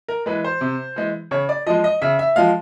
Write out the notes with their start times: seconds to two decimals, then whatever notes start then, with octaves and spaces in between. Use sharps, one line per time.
0.08 A#4
0.26 E3 G#3 B4
0.44 C5
0.61 C3
0.96 E3 G#3
1.31 C#3 C#5
1.49 D5
1.66 F3 G#3 D#5
1.84 D#5
2.02 C#3 E5
2.19 E5
2.36 F3 G#3 F5